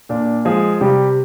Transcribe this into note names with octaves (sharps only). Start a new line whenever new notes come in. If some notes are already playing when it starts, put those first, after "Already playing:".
A#2 D4
F3 G#3 G#4
C3 G3 G4